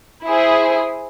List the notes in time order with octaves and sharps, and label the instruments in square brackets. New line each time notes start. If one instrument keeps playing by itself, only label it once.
[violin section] E4 G#4 C5